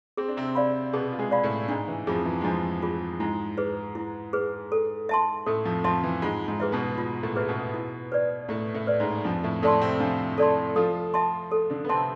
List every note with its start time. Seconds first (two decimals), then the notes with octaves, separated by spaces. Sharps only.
0.17 C4 G#4
0.28 D4
0.37 C3 C4
0.55 D5 F5 B5
0.93 B2 B3 G#4
1.12 F4
1.19 G#3 G#4
1.31 D5 F5 B5
1.43 A2 A3
1.68 G#2 G#3 D4
1.88 E3
2.07 F2 F3 F4 G#4
2.26 E3
2.41 G#3
2.44 F2 F3 D4
2.82 F4 G#4
3.20 G#2 G#3 E4
3.58 G#4 B4
3.95 E4
4.33 G#4 B4
4.72 A4
5.09 E5 A5 C6
5.46 A2 A3 A4
5.65 F2 F3
5.84 F2 F3 E5 A5 C6
6.04 E3
6.22 G#2 G#3 F4
6.48 G#2 G#3
6.60 G#4 B4 E5
6.72 B2 B3
6.98 F4
7.23 A2 A3
7.36 G#4 B4 E5
7.48 B2 B3
7.74 E4
8.12 B4 D5
8.49 A2 A3 E4
8.74 A2 A3
8.87 B4 D5
9.00 G#2 G#3
9.24 F2 F3 D4
9.43 A2 A3
9.63 A2 A3 A4 D5 A5 C6
9.81 C3 C4
10.00 F3 D4 F4
10.38 A4 D5 A5 C6
10.76 F3 F4 A4
11.14 E5 A5 C6
11.52 A4
11.70 D3 D4
11.84 B3
11.89 C3 C4 E5 A5 C6